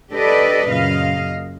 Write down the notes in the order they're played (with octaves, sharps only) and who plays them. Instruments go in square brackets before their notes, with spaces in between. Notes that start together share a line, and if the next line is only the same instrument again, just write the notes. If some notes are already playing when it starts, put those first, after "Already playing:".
[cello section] D4 G4 A4 B4 D5 D#5
F#2 A#2 C#3 D#5 F5